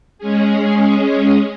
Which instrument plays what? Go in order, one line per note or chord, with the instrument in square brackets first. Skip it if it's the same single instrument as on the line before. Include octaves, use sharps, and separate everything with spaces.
[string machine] G#3 C#4 G#4